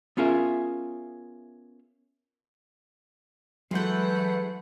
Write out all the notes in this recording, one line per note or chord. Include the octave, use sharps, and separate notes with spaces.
B3 C#4 F4 G#4 A#4 E5
E3 F#3 G#3 A3 B4 F#5 G6